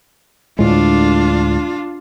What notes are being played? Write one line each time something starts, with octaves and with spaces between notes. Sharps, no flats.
D2 A2 G#3 D4 F4